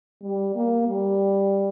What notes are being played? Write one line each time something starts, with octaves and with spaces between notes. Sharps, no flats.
G3
A#3
G3